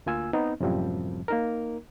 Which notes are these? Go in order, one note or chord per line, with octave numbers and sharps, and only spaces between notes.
D2 A#3 F4 G#5 E6
B3 C4 D#4
F#2 A2 C3 F3 G3 C4
A#3 D#4 A#4